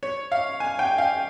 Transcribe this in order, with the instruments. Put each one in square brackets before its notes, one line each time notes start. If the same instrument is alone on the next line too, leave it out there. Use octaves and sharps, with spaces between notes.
[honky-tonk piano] C#5
F5
G#5
G5
F5